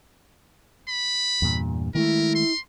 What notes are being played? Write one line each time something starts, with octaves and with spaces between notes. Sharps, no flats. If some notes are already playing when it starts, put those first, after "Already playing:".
B5
E2 G2 A#2
D#3 G#3 A3 E4 A#4
C6